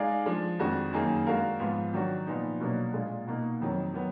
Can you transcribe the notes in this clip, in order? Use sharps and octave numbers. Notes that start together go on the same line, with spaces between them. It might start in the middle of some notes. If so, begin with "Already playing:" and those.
Already playing: G#3 D#4 G#4 D5 F5
F3 G#3 D4
F2 D#3 G#3 D4 F#4
F#2 D#3 A#3 D#4 G#4
G#3 D4 F#4 A#4 F5
G#2 F3 B3 F4
D#3 F#3 D4 F#4
A#2 F3 B3 D#4
B2 F#3 A#3 D4 F#4
A#2 G#3 D4 F4
B2 A#3 D#4 A#4
F2 D#3 F#3
D#3 F#3 B3